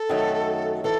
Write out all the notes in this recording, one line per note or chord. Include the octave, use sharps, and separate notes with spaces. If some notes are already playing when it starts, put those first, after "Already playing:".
Already playing: A4
F#2 D#3 F#3 A3
E3 A4